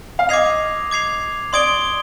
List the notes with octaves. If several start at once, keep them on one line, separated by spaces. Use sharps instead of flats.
F5
D#5 D6 G#6 C7 F7
D6 G#6 C7 F7
D5 C6 D#6 G#6 D7 G7